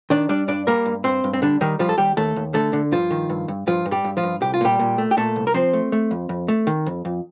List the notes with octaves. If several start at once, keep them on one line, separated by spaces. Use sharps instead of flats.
D#3 D4 D5
G3 D4 D5
G2 D4 D5
G3 A#3 A#4
G2
G2 C4 C5
G2
C4
D3 G3 D4
D#3 G3 D#4
F3 G3 F4
A4
D#2 G3 G4
D#2 A3 A4
D#2
D3 A3 A4
D3
G2 F3 F4
D#3
G2
G2
G2 F3 F4
G2
G3 G4
G2
F3 F4
G2
C2 G4
F4
A#2 G3 G4
A#2
A3
G4
A#2 A3 A4
C2
A#4
F3 C4 C5
A3
A3
F2
F2
A3
D#3
F2
F2